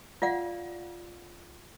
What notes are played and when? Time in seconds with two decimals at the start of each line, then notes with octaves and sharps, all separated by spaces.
0.22 F4 D5 F5 F#5